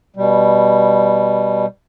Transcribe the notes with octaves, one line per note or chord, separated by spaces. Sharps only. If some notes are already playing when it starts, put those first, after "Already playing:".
B2 G3